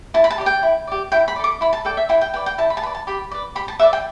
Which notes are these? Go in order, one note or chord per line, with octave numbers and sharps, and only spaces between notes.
E4 A5
B5
A5
G4 D5
G5
E4
G4 D5
E4 G5
B5
D5
A4 D6
E4 B5
A5
A4 D5 G5
E5
E4 G5
G5
B4 D5 G5
G5
E4 A5
B5
A5
B4 D5 B5
A5
G4 B5
B4 D5
G4 B5
A5
B4 D5 E5
G5